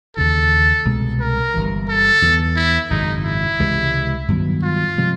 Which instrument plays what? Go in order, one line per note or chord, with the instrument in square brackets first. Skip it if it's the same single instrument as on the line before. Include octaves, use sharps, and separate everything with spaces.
[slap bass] D#2 C#3 E3 [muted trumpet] A4
[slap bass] C2 B2 G#3 B3
[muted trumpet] A#4
[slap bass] G1 G2 E3
[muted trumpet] A4
[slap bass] E2 C#3 E3
[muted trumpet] E4
[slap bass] G#1 F#2 C#3 [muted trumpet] D#4
[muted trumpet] E4
[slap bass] C#2 C3 E3 G#3
G2 D#3 F#3 B3
[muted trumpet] F4
[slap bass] C3 F3 G#3